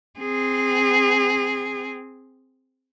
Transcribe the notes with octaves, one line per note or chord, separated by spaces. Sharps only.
C4 G#4